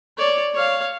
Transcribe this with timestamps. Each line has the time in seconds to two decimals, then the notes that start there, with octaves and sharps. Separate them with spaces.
0.18 C#5 D5
0.54 C#5 F5